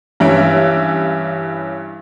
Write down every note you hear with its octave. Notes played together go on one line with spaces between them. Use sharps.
G2 E3 C#4 E5 D7